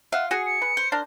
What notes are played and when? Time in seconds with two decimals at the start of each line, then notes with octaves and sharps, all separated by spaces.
0.12 F4 E5 F#5
0.31 F#4 G#4 C#7
0.46 C#7
0.62 B4
0.77 C5
0.92 D4 A#4 F6